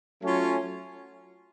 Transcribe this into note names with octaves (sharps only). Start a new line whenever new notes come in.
F#3 A3 C#4 F4